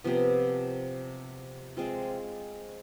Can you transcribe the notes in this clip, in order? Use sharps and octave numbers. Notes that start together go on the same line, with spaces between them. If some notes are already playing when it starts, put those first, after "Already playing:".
C3 F3 B3
G#3 C4 F4